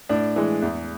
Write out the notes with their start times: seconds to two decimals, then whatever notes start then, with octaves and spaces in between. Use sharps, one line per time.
0.09 A2 D4
0.36 E3 G#3
0.62 E2